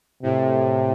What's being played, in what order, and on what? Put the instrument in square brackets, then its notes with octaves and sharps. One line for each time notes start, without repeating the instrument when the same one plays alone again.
[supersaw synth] A2 [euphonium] C3